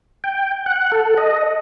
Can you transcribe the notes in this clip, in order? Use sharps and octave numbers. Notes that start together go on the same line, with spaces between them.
G5
F#5
A4
D#5